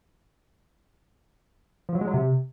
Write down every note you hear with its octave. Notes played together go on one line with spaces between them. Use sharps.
F3
F#3
G#3
F#3
C3